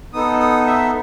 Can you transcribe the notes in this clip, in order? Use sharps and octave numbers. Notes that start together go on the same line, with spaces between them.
B3 D#4 A4 D#6
D#6
E5